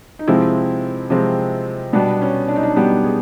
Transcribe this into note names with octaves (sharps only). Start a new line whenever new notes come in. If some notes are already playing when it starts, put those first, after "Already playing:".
D#4
C3 F3 G#3 C4 E4
C3 F3 G#3 C4
B2 G3 B3 D4
C#4
D4
D#4
D4
B2 G3 B3 G4
G#4